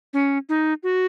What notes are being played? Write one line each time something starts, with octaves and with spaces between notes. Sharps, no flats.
C#4
D#4
F#4